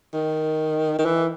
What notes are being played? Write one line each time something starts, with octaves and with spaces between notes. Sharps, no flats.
D#3
D#3
E3